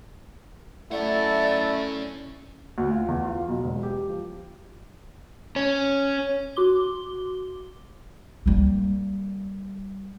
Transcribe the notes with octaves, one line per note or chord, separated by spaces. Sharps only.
A3 C#4 E4 D5 F#5
D2
F4
E2
F4
B1
E1
G4
F3
C#4
F#4 C6 D6 G7
G3 A#3